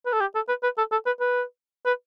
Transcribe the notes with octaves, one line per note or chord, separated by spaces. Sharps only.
B4
A4
G4
A4
B4
B4
A4
A4
B4
B4
B4